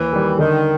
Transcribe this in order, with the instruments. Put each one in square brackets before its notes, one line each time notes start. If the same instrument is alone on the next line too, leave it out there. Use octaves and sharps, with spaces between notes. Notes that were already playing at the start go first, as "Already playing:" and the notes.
Already playing: [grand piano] D#2 [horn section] E3
[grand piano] D#3 G3
[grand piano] D3 [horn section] D#3